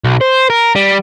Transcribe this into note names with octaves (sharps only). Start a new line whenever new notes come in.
B1
C5
A#4
G3